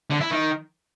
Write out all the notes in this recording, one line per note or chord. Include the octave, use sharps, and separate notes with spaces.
D3
E4
D#3